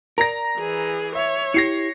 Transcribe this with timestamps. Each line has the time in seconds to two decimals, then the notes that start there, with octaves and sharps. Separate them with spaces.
0.18 A#4 D5 A#5 A#6
0.58 E3 G#4
1.15 C#5 E5
1.54 E4 G4 A#6 C7 C#7